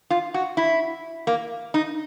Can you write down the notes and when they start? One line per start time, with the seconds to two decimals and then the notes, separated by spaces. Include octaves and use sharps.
0.10 F4
0.34 F#4
0.57 E4
1.27 A#3
1.74 D#4